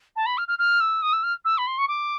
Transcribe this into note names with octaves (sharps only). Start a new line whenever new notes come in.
A5
B5
F6
F6
F6
E6
D#6
E6
F6
E6
B5
C6
C#6
D6